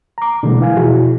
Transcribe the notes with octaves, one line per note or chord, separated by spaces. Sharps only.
A#5 D6
B2 D3 E3 G3 G#3 A#3
E3 F5 G#5
B2 F3 E4 F#4 G#4